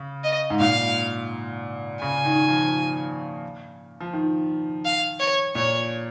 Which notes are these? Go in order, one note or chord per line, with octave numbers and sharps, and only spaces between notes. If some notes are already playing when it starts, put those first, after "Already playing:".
Already playing: C#3
D#5
G#2
A#2 F5
C#3 G#5
D#3
F3
F3
D#3
F5
C#5
A#2 C#5